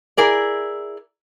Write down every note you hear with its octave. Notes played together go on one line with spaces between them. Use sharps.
E4 G#4 A#4 D5